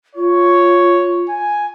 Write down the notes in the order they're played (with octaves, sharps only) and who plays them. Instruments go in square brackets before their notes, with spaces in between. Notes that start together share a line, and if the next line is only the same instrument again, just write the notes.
[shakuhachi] F4 [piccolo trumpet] C#5
[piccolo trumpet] G#5